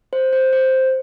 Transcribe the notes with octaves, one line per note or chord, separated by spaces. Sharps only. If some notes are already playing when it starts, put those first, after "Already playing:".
C5
C5
C5